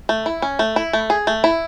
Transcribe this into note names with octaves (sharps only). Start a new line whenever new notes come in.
A3
E4
C#4
A3
E4
A3
G#4
A3
E4